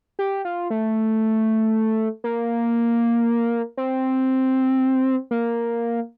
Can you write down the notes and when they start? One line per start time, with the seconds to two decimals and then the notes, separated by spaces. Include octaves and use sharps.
0.19 G4
0.45 F4
0.70 A3
2.24 A#3
3.77 C4
5.31 A#3